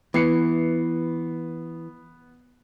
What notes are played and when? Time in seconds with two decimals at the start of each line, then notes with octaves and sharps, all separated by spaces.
0.14 E3 B3 C7 C#7